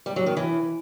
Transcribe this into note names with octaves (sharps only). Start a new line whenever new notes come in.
G3
F#3
D#3
E3